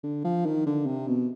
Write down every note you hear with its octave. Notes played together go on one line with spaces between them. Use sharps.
D3
F3
D#3
D3
C3
B2